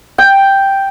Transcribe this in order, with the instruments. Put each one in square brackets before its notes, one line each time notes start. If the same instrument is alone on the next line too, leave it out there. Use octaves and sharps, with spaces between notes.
[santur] G5